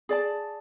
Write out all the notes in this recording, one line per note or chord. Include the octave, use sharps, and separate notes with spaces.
G#4 D5 A5